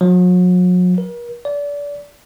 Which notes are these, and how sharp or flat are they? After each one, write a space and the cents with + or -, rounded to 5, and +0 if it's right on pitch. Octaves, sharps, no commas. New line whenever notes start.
F#3 -40
A#4 +40
D5 -30